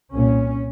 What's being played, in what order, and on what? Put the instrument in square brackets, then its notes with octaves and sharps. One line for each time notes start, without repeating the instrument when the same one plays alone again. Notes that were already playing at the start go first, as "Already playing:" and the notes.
[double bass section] C2 A#2 C#4